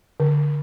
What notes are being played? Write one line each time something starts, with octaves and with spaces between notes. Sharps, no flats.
D3